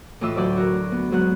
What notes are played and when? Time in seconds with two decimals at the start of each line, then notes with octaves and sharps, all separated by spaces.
0.21 A2 E3 F4 D#5 D6 E6
0.36 D2 F#3 D5 E6 G6
0.57 F#4 A#4
0.92 B3
1.11 G#2 F#3 B3 F#6